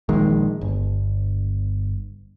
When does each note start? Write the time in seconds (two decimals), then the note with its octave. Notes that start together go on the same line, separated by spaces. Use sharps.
0.09 A#1 D#3 G#3
0.61 G1